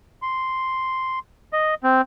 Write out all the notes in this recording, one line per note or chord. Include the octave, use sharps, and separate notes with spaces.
C6
D#5
C4